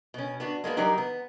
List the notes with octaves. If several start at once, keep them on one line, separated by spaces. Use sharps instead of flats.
B2 C#4
B3 D4 F#4
G#3 A#3 B3 F#4
E3 F#3 G3 D#4 A#4 D5
B3